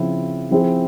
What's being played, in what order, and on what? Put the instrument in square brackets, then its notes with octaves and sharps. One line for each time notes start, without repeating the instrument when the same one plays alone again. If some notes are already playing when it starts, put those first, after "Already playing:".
Already playing: [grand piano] C#3 F3 C4 E4
F3 C4 E4 G#4